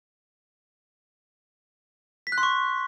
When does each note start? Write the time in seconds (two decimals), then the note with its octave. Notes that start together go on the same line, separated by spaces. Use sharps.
2.27 B6
2.32 F#6
2.38 C6
2.43 C#6